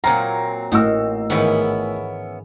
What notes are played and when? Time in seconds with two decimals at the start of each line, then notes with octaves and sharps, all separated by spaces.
0.04 A#2 F#3 C4 F4 A#5
0.72 A1 A2 D#4 F#4 A#4 E6
1.30 G#2 D#3 E3 B3 C#4 E4